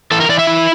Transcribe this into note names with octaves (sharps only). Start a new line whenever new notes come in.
E3 A4
A#4
E3 D5
E5
E4